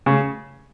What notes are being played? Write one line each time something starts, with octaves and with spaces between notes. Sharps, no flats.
C#3